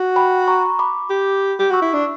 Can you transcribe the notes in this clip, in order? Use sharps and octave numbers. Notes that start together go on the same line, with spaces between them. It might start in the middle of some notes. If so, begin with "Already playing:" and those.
Already playing: F#4
G5 B5
A#5 C#6
B5 D6
G4
G4
F#4 C#6 E6
E4
D4